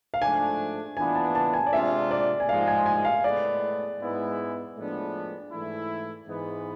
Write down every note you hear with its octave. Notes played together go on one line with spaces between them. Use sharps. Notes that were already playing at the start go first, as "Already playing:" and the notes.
F5
G#2 F3 A3 D4 G#5
E3 B3 D4 F4 G#5
A5
A5
G#5
D5
C3 G#3 D4 F4 E5
D5
G#5
G#2 F3 G#3 F5
G#5
G#5
F5
A2 G#3 B3 D5
G#2 G#3 B3 E4
A2 F3 G#3 B3 D4
G#2 E3 A3 E4
G#2 E3 G#3 B3